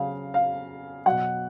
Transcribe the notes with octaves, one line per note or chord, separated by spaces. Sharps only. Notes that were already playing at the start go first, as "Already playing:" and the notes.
Already playing: C#3 F#3 F5
F5
B2 F#3 F#5